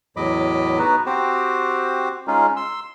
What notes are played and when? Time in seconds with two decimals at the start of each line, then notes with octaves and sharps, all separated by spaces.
0.17 E2 A2 F#3 D#5 B5 D6
0.79 B3 D#4 F#4 B4
1.06 C4 F#4 G4 C5
2.27 G#3 C#4 D#4 F4 G#4
2.57 C6 E6